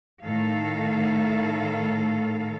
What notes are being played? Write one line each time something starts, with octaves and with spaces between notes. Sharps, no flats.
A2 D#3 A4 F5